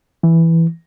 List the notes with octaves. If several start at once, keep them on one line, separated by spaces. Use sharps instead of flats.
E3